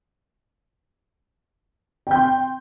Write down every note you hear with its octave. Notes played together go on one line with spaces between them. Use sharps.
G5 C6 G6